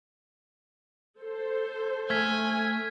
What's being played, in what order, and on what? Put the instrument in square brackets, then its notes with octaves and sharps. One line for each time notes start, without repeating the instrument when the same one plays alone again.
[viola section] A4 C5
[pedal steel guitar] A3 [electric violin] G#5 [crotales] F6 G#6 B6